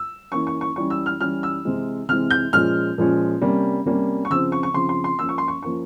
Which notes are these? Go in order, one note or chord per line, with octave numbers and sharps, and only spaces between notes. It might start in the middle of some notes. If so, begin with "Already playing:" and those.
Already playing: E6
E3 A#3 C#4 C#6
C#6
C#6
E3 G3 C#4 C#6
E6
F6
E3 G3 C#4 F6
E6
C3 E3 G#3 C4
C3 E3 G#3 C4 F6
G6
A#2 F3 G#3 C#4 F6
A#2 F3 G#3 C#4
C3 G3 A#3 C#4
C3 G3 A#3 C#4
C#6
C#3 F3 C4 E6
C#6
C#6
C#3 F3 C4 C6
C6
C6
F3 A#3 C#4 E6
C#6
C6
C#6
F3 A#3 C#4 C#6